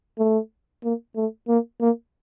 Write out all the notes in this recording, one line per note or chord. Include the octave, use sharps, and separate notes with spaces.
A3
A#3
A3
A#3
A#3